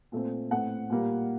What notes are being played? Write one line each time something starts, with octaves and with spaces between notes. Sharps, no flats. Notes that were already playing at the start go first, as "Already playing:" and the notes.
A#2 A3 C4
A2 A3 C4 F#5
A#2 G3 A#3